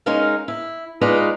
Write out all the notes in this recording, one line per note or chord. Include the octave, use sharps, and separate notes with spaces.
G#3 C#4 D#4 A#4 F5
E4
G#3 D#4 F4 B4 D5 D#5